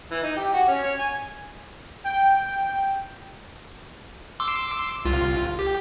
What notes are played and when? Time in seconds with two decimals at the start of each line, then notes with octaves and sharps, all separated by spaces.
0.11 E3
0.23 D#4
0.37 G4
0.54 F#4
0.68 C#4
0.83 C#5
0.99 G#5
2.04 G5
4.40 C6 D6 E6
5.05 C2 F4
5.59 G4